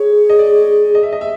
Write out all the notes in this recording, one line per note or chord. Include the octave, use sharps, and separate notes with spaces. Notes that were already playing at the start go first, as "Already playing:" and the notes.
Already playing: G#4 C#5
D#5
D5
D#5
E5
D#5
E5